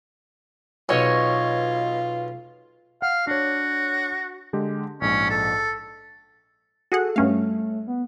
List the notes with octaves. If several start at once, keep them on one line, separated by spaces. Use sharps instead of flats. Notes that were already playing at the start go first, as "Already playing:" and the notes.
B1 B2 F4 C#5 D#5
F5 F#5
D4 F#4 C#5
D3 G#3 G4
A#1 G#2 C#4
A4
F#4 G#4 A4 F#5
G2 A3 C#4 F5
B3